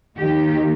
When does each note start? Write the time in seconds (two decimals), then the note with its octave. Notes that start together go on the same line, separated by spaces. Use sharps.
0.18 D#2 D#3 A#3 G4